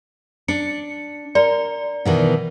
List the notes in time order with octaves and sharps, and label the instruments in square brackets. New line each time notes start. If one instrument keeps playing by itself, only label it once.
[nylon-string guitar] D4 [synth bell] C#7
[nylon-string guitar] A#4 [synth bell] D5
[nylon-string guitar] B2 D#3 E3